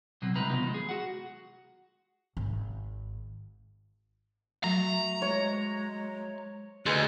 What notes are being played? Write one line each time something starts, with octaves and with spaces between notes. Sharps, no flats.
B2 F#3 C4
C3 G3 G#3 D#4 B4 A#5
F3 B3 D#4
F3 G#3
G#4
F#4 F#5
G#1
F#3 A3 A#5
G#3 C#5
D2 G#3 B4